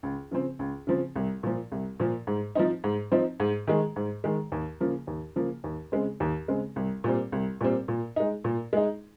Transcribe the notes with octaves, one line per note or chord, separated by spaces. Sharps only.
C#2
C#3 F3 C4
C#2
C#3 F3 C4
C2
A#2 F3
C2
A#2 F3
G#2
F3 C4 D#4
G#2
F3 C4 D#4
G#2
D#3 G#3
G#2
D#3 G#3
D#2
C#3 F3 A#3
D#2
C#3 F3 A#3
D#2
C#3 G#3 C4
D#2
C#3 G#3 C4
C2
A#2 G3 C4
C2
A#2 G3 C4
A#2
G#3 D#4
A#2
G#3 D#4